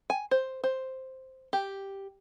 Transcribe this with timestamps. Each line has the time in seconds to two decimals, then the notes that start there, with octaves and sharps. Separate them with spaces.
0.10 G#5
0.31 C5
0.64 C5
1.53 G4